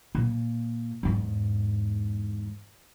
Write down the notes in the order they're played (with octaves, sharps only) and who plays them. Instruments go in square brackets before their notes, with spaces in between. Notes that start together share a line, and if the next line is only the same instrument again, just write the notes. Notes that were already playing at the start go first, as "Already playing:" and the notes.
[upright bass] A#2
E2 G#2